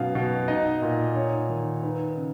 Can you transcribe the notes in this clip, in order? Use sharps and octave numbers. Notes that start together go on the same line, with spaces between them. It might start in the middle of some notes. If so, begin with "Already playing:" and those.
Already playing: F#2 B2 D#4 F5
B2
D#4 D#5
A#2
D#4 C#5
D#3
D#4 B4
C#3